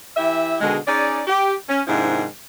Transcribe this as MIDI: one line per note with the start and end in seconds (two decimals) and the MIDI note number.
0.16 0.56 52
0.16 0.56 64
0.16 0.56 67
0.16 0.56 76
0.61 0.77 47
0.61 0.77 50
0.61 0.77 51
0.61 0.77 56
0.87 1.21 61
0.87 1.21 63
0.87 1.21 68
0.87 1.21 74
1.27 1.54 67
1.69 1.82 61
1.87 2.24 44
1.87 2.24 48
1.87 2.24 51
1.87 2.24 53
1.87 2.24 62
1.87 2.24 64